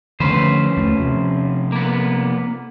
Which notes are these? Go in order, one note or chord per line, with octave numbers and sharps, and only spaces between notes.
D3 F3 A3 C#4 B4 C5
D#2 A3
C3 F3
A#3 B3